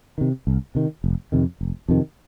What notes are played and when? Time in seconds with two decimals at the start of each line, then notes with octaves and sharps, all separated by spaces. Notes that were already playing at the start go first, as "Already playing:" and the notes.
0.18 C3 D#3
0.47 C2
0.75 C3 D#3
1.04 F1
1.32 F2 C3 D#3
1.61 F1
1.88 F2 C3 D#3